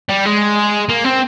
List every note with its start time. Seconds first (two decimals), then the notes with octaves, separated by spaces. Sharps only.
0.09 G3
0.25 G#3
0.89 A#3
1.05 C4